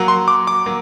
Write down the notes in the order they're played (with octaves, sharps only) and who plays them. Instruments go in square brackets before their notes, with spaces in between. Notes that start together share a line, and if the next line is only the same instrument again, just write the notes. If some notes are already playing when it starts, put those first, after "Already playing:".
Already playing: [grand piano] F#3 A#3 F#4
[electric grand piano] C6
D6
D6
[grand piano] F#3 A#3